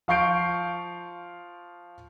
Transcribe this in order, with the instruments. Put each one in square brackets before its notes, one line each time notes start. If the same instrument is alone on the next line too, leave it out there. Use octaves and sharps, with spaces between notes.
[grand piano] F3 F5 C#6 G6 C7 D7